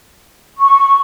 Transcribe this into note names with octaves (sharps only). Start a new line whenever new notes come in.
C#6